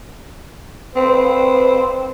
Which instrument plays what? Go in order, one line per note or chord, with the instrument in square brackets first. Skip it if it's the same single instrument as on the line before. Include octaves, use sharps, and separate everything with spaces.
[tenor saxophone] C4 [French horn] B4